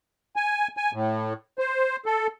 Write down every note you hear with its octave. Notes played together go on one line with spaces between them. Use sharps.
G#5
G#5
A2
C5
A4